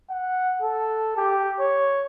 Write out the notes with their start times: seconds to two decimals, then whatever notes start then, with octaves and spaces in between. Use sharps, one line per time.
0.10 F#5
0.62 A4
1.17 G4
1.60 C#5